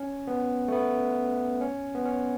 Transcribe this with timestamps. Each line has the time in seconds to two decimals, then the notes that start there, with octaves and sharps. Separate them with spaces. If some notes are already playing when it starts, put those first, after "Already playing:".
Already playing: C#4
0.27 B3
0.68 A3
0.72 B3
1.61 C#4
1.95 B3
2.06 C#4